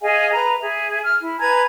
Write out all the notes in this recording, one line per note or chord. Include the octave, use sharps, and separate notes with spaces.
G#4 D#5 F5 G#5
B4 A#5
G#4 E5
F6
E4
B4 G#5 A#5 G#6